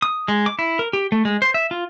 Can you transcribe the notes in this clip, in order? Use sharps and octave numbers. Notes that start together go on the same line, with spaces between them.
D#6
G#3
D6
E4
A#4
G4
A3
G#3
C5
E5
F4